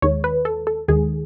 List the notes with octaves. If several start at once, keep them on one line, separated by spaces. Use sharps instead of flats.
D#2 D#3 G#3 C#5
B4
A4
A4
D#2 D#3 G#3 G#4